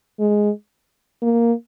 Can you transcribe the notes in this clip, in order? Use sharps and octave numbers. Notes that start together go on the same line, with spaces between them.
G#3
A#3